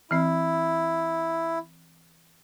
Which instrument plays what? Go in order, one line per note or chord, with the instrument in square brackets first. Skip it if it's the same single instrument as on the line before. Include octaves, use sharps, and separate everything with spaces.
[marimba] E3 C4 [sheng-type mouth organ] E4